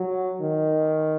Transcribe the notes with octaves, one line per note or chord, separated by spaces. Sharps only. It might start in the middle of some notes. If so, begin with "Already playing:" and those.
Already playing: F#3
D#3